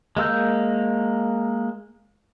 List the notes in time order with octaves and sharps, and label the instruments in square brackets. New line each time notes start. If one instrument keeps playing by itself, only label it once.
[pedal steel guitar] G#3 A#3 E6 G6